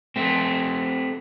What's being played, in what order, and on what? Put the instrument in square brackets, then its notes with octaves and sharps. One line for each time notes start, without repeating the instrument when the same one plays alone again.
[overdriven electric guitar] A3 C4